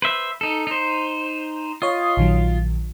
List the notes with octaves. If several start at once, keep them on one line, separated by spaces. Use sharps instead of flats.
B4 C5 E5
D#4 A4
D#4 C5
F4 C#5 D#5 D#6
A#1 D#3 F#3